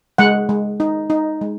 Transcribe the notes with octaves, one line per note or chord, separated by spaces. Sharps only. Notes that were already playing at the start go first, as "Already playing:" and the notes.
G#3 F#5
G#3
D#4
D#4
G#3